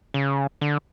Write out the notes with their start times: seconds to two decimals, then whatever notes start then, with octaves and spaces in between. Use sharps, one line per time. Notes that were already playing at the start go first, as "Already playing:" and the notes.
0.14 C#3
0.61 D3